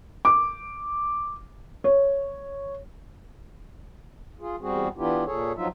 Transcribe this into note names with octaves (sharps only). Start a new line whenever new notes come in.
D6
C#5
F4 G#4
E2 G3 C4 F#4 G#4
E3 B3 D4 E4 F4 G4
A#2 G#4 A4 C#5
G2 F3 F#3 D#4 F4 E5